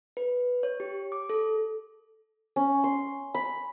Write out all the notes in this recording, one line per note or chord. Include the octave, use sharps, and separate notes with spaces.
B4
C#5
G4
D6
A4
C#4
C6
B5